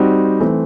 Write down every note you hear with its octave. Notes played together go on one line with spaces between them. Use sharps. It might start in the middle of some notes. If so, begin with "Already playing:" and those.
Already playing: G3 C4 D#4 F#4
E3 A3 C4